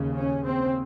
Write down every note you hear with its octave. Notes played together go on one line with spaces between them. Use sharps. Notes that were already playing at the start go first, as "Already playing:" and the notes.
Already playing: D#2 C#3
C#4
C4